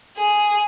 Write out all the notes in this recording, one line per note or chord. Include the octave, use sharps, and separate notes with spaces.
G#4